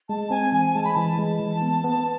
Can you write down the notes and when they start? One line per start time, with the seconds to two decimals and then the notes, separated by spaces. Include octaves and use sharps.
0.09 G#3 A5
0.30 C4 G#5
0.52 E3 G#5
0.74 G#3 A5
0.85 B5
0.94 E3 A5
1.18 G#3
1.40 E3
1.62 B3
1.84 B3